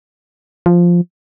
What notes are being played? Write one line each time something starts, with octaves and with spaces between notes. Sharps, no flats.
F3